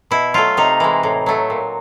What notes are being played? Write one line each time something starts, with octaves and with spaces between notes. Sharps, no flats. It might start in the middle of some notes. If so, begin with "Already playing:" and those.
B2 E4
F#3 A3 F4
C3 D#4
E3 G#3
A2
F#3 A3
A#2